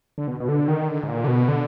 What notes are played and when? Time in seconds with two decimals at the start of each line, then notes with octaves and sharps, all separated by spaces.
0.18 D3
0.28 B2
0.40 B2
0.49 D3
0.68 D#3
0.89 D3
1.03 G#2
1.08 A#2
1.24 D3
1.28 B2
1.48 D3